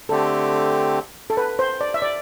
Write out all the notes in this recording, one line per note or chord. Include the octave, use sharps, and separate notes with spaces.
D3 A3 C4 G4 A4
A4
B4
C5
D5
E5
D5